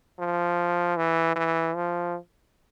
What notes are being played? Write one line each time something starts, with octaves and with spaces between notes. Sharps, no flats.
F3
E3
E3
F3